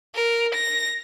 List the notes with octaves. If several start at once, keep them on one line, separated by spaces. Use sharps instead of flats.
A#4
A#6